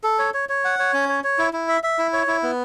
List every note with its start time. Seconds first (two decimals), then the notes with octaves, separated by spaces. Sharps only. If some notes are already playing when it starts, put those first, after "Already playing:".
0.04 A4
0.19 C#5
0.34 C#5
0.49 C#5
0.65 F#5
0.79 C#5
0.94 C#4
1.09 C#5
1.24 C#5
1.39 E4
1.53 E4
1.68 E5
1.84 E5
1.99 E4
2.13 C#5
2.28 E4
2.43 B3